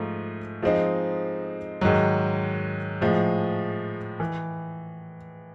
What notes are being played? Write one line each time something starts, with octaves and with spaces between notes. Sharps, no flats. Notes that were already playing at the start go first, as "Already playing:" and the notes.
Already playing: G#2 F3 A3
F3 G#3 C4 D#4
G#2 D#3 F#3
A2 F3 G#3
E3